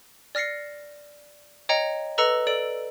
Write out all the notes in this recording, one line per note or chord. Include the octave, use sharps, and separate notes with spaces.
D5 F6 A#6 C7 C#7
C#5 D#5 G5 A#5 C#7
A4 B4 D#5 A#5 E6 C#7
A4 D5 D7